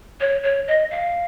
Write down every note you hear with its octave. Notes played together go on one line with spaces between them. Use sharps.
C#5
C#5
D#5
F5